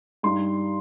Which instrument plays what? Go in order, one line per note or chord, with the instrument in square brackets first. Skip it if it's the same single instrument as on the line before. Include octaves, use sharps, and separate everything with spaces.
[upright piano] G2 G3 D#4 C6